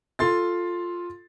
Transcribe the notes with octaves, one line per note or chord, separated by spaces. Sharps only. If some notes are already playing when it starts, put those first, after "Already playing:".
F4 A4 C6 A6